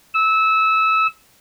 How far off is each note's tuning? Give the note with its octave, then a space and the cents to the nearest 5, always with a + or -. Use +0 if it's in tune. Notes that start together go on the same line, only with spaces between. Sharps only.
E6 -20